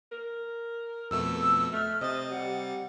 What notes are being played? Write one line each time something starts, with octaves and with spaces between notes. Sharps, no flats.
A#4
F2 B2 A3 E6
A3 F6
C3 C5 D#5 A6
G3 F#5